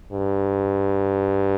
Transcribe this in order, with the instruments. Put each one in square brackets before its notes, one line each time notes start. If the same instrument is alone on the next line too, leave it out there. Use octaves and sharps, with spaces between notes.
[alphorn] G2